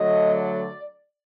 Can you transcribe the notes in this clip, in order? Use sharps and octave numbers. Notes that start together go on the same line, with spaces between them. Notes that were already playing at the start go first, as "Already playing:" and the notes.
Already playing: D3 F#3 A3 D#5
D5